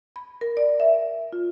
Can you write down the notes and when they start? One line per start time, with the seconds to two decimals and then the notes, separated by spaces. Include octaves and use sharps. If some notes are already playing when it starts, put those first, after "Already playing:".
0.16 B5
0.41 A#4
0.57 D5
0.80 E5
1.33 F4